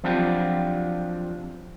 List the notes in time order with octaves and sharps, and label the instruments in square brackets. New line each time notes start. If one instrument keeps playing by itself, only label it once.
[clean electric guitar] F3 F#3 C4 D4 F4 G4